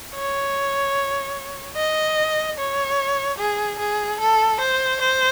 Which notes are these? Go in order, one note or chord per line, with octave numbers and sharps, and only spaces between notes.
C#5
D#5
C#5
G#4
G#4
A4
C5
C5